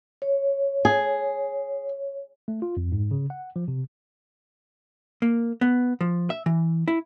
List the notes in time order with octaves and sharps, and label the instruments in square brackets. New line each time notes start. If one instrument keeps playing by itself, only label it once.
[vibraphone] C#5
[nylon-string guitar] G#4
[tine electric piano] A3
F4
F2
G#2
C#3
F#5
F3
C3
[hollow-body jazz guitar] A#3
B3
F3
E5
E3
E4